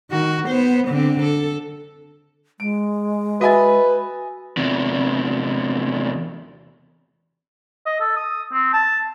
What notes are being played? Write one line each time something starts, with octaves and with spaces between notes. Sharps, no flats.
D#3 F#4
B3 C5
D3 C4
A4
G#3 D7
F#4 B4 D#5 E5 G#5 A6
E2 C3
D#5
A4
D#6
C4
A5